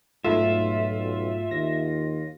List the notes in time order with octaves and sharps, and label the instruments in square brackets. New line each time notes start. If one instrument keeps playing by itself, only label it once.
[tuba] B1 [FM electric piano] G#2 A3 [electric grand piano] F4 [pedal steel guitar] E5
[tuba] D#2 [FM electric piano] A#6